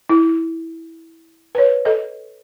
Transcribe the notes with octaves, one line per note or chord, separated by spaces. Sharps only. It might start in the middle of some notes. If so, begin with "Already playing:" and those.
E4
B4 C#5
A4 D#5